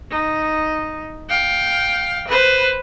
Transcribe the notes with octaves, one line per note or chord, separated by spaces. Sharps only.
D#4
F5 G5
B4 C5